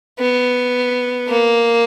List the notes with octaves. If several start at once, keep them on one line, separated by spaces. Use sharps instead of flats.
B3
A#3